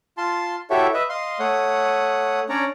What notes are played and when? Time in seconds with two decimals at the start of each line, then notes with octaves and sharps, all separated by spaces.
0.18 F4 A5 C6
0.70 E4 F#4 G4 A4 C#5 E5
0.94 B4 D#5 E5
1.09 D#5 F5 C6
1.39 A3 C#5 F#5 D#6
2.49 C#4 D4 C#5 D5 A#5